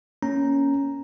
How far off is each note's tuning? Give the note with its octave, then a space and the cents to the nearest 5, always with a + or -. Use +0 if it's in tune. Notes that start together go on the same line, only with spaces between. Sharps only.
A#3 +15 C#4 +5 A#5 +0